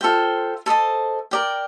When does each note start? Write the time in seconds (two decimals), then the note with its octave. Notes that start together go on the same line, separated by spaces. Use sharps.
0.01 F4 A4 C5 G5
0.66 A4 C5 D#5 A5
1.31 A#4 D5 G5